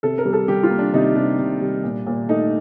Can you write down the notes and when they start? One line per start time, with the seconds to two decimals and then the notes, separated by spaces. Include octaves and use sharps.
0.03 C3 A4
0.18 A#4
0.25 G3
0.33 A4
0.48 G3 G4
0.63 F4
0.70 A#3
0.78 D4
0.93 C3 D#4
1.15 C3 D4
1.39 C3
1.61 G3
1.84 A#2
2.07 A#2
2.29 A3 D#4